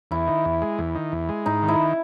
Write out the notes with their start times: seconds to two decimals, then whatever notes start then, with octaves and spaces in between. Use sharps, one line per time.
0.11 E2 E4
0.27 D#3
0.45 E2
0.62 G#3
0.78 E2
0.95 D#3
1.12 E2
1.29 G#3
1.46 G#2 D#4
1.63 D#3
1.68 E4